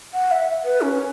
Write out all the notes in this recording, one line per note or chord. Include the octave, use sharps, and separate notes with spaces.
F#5
E5
B4
C#4